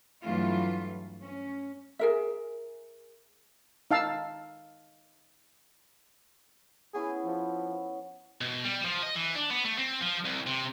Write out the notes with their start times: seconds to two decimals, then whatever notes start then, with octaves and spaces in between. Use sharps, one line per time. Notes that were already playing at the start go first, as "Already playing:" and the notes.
0.22 G2 E3 F#3 A3 F4
1.20 C#4
1.99 G#4 A#4 E5
3.91 D#4 F5 A5 E6
6.94 B3 C#4 E4 G#4
7.25 F3
8.41 B2
8.64 G3
8.85 F3
9.02 D#5
9.15 E3
9.35 D4
9.51 B3
9.65 A3
9.79 C4
10.02 F3
10.26 C2
10.47 C3